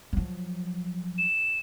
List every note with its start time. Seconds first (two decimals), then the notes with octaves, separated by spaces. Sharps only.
0.13 F3 F#3
1.18 E7